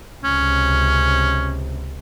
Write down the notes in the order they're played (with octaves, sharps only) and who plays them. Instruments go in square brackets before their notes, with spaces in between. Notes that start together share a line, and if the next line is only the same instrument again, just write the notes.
[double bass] C#2 C3 [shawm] C#4